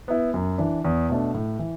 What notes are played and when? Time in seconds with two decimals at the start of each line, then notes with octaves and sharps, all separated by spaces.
0.08 B3 E4
0.34 F#2
0.58 E3 D4
0.84 E2
1.09 B2 A3 D4
1.35 A2
1.59 E3